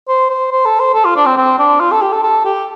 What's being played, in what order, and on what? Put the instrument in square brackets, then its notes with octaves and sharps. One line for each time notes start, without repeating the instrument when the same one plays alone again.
[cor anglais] C5
C5
C5
A4
C5
A4
F4
D4
C4
C4
D4
F4
A4
G4
A4
A4
G4